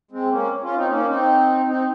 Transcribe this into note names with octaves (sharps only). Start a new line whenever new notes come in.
G#3 C4
A#3 C#4
C#4 F4
C4 D#4
A#3 C#4
C4 D#4
C4 D#4